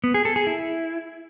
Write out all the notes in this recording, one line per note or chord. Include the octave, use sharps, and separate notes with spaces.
B3
G#4
A4
G#4
E4